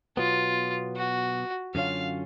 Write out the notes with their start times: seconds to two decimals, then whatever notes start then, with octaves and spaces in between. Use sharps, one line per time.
0.17 B2 F#3 B3 F4
0.96 F#4
1.75 F#2 D3 F#3 C#4 F4 F5